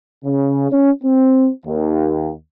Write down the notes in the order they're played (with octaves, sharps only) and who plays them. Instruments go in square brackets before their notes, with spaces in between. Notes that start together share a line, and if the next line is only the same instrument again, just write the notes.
[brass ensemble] C#3
C#4
C4
D#2